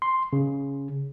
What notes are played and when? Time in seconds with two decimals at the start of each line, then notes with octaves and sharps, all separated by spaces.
0.02 C6
0.33 C#3